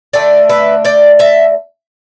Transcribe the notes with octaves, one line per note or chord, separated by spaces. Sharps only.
D3 A3 D4 D5 G5
B4 E5
D5 G5
E5 A5